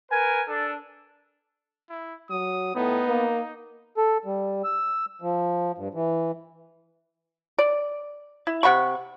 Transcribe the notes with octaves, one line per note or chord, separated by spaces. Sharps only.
A#4 B4 G#5
D4 A4
E4
F#3 D#6
A2 B3 D#4
A#3
A4
G3
E6
F3
G2
E3
D5
E4
C3 F#5 B5 C#6